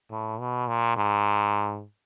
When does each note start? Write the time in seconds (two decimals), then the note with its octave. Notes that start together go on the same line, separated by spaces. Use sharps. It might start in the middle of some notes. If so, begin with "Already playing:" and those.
0.11 A2
0.40 B2
0.68 A#2
0.96 G#2